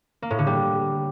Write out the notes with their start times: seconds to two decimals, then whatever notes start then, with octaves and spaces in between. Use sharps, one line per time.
0.22 A#3
0.30 A2
0.39 D3
0.47 G3